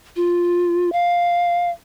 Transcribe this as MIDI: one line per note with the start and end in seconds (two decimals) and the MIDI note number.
0.16 0.92 65
0.93 1.70 77